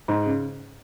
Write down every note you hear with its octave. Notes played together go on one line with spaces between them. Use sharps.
G#2
C#3